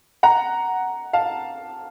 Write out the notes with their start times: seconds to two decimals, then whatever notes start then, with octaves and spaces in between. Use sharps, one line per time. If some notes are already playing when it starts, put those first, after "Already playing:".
0.23 F#5 A#5
1.13 F5 A5